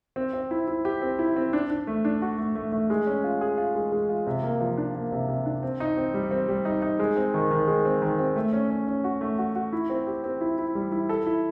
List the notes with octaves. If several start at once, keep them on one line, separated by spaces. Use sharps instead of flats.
C4
C4
E4
E4
G4
C4
E4
C4
D4
D4
A3
D4
F#4
A3
A3
A3
G#3
C#4
F4
G#4
F4
G#3
G#3
F4
C3
A#3
F3
D4
A#3
C3
C3
D4
C4
D#4
C4
G3
C4
G3
D#4
D#4
G#3
C4
D#3
D#3
G#3
C4
D#3
C4
A3
C#4
C#4
C#4
F#4
A3
F#4
F#4
E4
C4
G4
C4
E4
E4
G3
E4
A4
E4